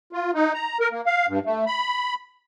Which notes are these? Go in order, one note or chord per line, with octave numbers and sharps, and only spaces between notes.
F4
D#4
A#5
A#4
A#3
F5
G2
A3
B5